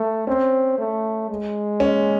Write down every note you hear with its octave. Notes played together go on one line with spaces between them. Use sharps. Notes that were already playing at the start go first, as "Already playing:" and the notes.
Already playing: A3
C4 C#4
A3
G#3
C#4